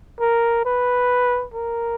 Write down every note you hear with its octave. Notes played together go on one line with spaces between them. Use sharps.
A#4
B4
A#4